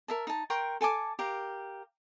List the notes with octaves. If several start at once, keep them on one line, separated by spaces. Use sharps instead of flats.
A#4 E5 A5
D#4 A5
A#4 G5 C6 C#6
A4 G#5 A5 D6
G4 A#4 F5